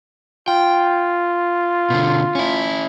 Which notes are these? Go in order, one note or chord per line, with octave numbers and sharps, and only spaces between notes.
F4 G5
B2 D3
C#4 E4